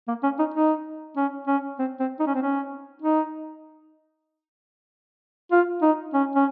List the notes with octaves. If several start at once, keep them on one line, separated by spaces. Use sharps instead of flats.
A#3
C#4
D#4
D#4
C#4
C#4
C4
C4
D#4
C#4
C4
C#4
D#4
F4
D#4
C#4
C#4